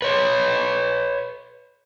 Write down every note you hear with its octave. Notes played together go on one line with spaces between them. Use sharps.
B4 C#5